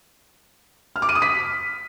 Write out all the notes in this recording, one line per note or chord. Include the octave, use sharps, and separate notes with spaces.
F6
D6
D#7
D#6
B6